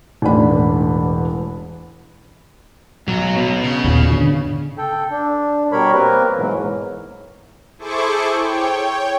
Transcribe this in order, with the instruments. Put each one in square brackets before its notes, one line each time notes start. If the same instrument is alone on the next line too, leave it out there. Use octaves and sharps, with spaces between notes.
[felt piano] E1 A1 D4 B5
[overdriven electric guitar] B1 [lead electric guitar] F#3
[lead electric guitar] B2 B3
[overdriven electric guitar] C#3
[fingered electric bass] D#2 A#2
G#2 D3 D4
[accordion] A4 G5
D4
B2 G3 A#4 C#5 B5
A#3 C4 A#4 B4
G#2 B2 E3 F#3
[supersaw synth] E4 G#4 A4 C5 C#6 D6
C#5 G5